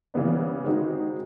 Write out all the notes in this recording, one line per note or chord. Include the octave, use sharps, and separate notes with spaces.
C#3 E3 G3 B3 D4
D#3 G#3 C4 D#4 F#4